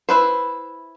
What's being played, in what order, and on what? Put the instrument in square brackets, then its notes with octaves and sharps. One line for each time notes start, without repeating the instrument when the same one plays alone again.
[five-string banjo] E4 B4 C5